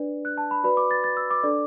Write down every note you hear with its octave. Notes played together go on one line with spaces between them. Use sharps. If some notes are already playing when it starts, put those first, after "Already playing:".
Already playing: D4 B4 D5
F#6
A5
B5
F#4 B4 D5 B5
D6
A6
A6
E6
D6
D4 A4 D5